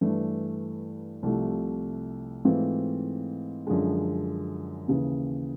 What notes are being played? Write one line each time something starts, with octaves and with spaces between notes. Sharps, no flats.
G2 E3 A3
C2 C3 F3 A3
G#2 E3 A3 C4 F4
F#2 D3 F3 G#3
D#2 C#3 E3